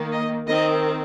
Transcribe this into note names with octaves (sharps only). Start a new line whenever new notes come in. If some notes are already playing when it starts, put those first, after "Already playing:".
Already playing: D#3 A#3
D#5
D#3 C4 D#5